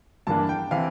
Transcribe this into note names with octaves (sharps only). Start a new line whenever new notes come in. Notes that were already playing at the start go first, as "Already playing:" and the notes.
G2 E3 A#3 D4 A5
G5
C3 E3 F5